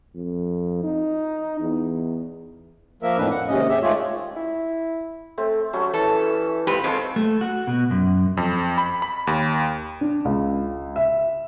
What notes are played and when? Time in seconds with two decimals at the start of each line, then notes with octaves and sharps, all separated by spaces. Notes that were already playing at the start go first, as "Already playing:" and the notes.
0.15 F2
0.84 D#4
1.60 E2
3.03 F3 A#3 A#4 E5
3.18 F2 A2 D#3 E3 D4 B4
3.31 F#5
3.48 D#2 G#2 C3 C#4 D#5
3.69 G4 G#4 E5
3.83 D#3 G#3 A3 F4 C#5 D5
4.36 E4
5.38 A3 C4
5.73 F#3 G3 A3 C#4
5.94 E3 A4
6.67 G#2 C4 F4 G4 B4
6.84 G#3 C4 A4 C#5 F5
7.16 A3
7.41 F#4
7.67 B2
7.91 F#2
8.37 F2
8.78 B5
9.02 B5
9.27 D#2
10.01 D4
10.25 C#2
10.96 E5